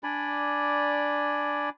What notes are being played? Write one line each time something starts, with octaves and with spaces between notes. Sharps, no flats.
D4 D5 G#5 B5